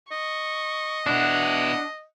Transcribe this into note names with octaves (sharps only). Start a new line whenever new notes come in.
D#5 C#6
B2 D4 E4 F#5